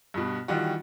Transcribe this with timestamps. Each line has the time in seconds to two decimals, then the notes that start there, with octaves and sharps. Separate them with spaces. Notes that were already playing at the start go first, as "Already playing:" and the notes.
0.14 G2 B2
0.48 D#3 E3 G3 F4 F#4